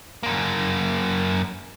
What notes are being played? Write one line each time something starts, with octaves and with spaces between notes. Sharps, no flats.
F#2 A#3